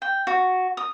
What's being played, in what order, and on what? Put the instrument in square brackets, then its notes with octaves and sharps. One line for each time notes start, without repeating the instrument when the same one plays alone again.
[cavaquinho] G5
F#4
D#6